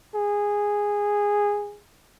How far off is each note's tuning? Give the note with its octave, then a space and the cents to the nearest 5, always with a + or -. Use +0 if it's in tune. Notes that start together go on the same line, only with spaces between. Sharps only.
G#4 -10